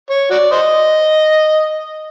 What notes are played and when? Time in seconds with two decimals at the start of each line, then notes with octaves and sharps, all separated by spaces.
0.10 C#5
0.31 F#4 D5
0.52 C5 D#5